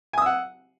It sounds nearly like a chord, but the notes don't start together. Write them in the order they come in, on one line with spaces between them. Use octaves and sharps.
G#5 D#6 E6 F#5